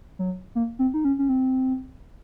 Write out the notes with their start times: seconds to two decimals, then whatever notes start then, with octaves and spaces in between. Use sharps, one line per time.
0.19 F#3
0.55 A#3
0.79 C4
0.94 D#4
1.05 C#4
1.19 C#4
1.29 C4